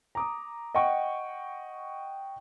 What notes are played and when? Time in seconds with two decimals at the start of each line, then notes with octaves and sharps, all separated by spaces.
0.15 A#5 D6 D#6
0.75 D#5 F#5 G5 C#6